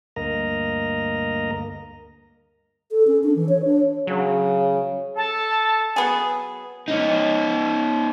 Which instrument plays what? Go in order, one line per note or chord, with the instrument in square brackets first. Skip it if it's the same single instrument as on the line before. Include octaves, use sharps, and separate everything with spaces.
[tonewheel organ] D2 G2 A#3 A#4 D#5 A#5
[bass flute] A4
C#4
D4
E3
C#5
D4
[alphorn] C#3 [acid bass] F#3
[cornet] A4 [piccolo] A5
[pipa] F#3 B3 G#4
[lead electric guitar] C#4 D#4